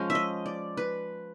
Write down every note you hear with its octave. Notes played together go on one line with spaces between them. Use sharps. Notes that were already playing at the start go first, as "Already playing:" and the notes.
Already playing: F3 G#3 C#4
E5
D#5
D5
B4